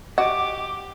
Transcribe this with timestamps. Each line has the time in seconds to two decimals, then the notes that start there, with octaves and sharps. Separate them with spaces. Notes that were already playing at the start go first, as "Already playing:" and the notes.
0.18 F#4 G4 D#5 D6